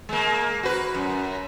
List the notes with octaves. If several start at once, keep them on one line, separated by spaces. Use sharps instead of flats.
G#3 A#3
F#4 B4
F#2